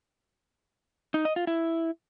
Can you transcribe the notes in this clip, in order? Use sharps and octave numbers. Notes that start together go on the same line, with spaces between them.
D#4
D#5
F4
E4